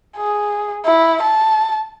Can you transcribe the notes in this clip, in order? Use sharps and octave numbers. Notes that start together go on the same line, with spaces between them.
G#4
E4
A5